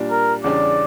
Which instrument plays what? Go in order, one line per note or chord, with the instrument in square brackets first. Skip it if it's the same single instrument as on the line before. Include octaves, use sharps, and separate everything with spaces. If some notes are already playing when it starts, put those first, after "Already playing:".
Already playing: [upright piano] A#2 G3 D4
[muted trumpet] A#4
[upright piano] E2 C#3 G3 D4 G4 [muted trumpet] D5